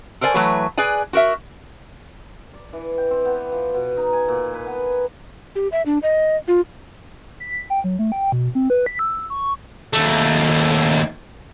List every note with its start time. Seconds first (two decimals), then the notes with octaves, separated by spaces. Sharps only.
0.21 A4 A#4 C5 D5 G#5
0.34 E3 F#3 A3 B4 C#5
0.77 G#4 B4 D5 G#5
1.13 F#4 A#4 E5
2.54 D5
2.73 E3
2.98 G5
3.11 C4
3.25 B3
3.52 F3
3.74 B2
3.97 D#4
4.13 G#5
4.28 A#2
4.54 B4
4.67 B3
5.55 G4
5.72 E5
5.86 D4
6.03 D#5
6.48 F4
7.40 B6
7.70 G5
7.84 F#3
7.99 A3
8.12 G5
8.32 B2
8.55 C4
8.70 B4
8.86 B6
8.99 E6
9.30 C#6
9.93 D#2 A3